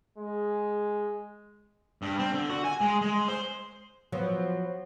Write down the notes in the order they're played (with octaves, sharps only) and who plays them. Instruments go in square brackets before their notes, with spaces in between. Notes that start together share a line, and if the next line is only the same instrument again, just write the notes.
[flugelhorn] G#3
[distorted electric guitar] G2
C4
D3
F#4
G#5
G#3
G#3
C5
[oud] F3 F#3 B3